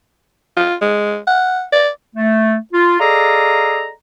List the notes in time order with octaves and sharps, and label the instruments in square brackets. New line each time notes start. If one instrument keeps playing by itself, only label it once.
[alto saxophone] F4
G#3
F#5
D5
[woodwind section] A3
F4
G#4 A4 D5 D#5 F5 A#5